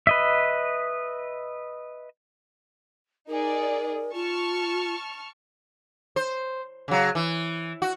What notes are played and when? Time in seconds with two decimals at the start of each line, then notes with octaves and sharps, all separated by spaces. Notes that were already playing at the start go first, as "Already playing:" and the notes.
0.07 B4 D#5 E5
3.28 D#4 G#4 A#4 D5
4.14 F4 A5 C#6 F6
6.16 C5
6.88 C#3 F#3
7.15 E3
7.82 F#4